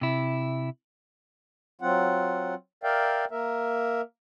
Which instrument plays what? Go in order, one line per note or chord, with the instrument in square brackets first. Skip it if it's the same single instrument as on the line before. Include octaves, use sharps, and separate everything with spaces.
[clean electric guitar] C3 E4
[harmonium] F#3 C4 F4 F#5
A#4 D5 E5 F5 G5
A#3 A#4 E5